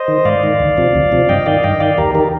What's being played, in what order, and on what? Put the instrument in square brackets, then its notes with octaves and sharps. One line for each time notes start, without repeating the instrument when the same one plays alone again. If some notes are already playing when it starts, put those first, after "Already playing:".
Already playing: [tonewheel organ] C5 D#5
D#3
G#2 D5 F5
D#3
D2
C3 F3
D2
C3 F3
G2 D#5 G5
D#3 D5 F5
G2 D#5 G5
D#3 D5 F5
D#2 G4 A#4
D#3 G4 A#4